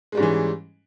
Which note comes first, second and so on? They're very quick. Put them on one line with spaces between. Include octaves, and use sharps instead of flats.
G#3 G3 G#2 C#4 E3